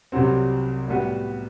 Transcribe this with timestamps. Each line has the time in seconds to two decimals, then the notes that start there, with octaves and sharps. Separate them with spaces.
0.12 C2 C3 F#3 C4
0.88 A2 G3 B3 F#4